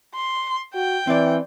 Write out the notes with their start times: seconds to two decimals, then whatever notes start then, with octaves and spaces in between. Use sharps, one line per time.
0.15 C6
0.74 F#4 G5
1.07 E3 C4 D5